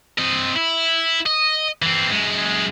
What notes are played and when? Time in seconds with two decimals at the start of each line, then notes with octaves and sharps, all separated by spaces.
0.19 C4 D#5
0.56 E4
1.26 D#5
1.82 E3 C4
2.11 F#2 G#3